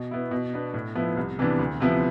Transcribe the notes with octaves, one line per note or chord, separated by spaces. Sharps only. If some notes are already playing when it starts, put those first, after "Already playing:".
Already playing: B2
B3 E4
B2
B3 D4
A2
F3 B3 E4
C2
C3 E3 B3 D4
D2
C3 F3 B3 E4